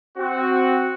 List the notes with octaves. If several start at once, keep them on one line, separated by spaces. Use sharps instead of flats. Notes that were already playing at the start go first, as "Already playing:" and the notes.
C4 F#4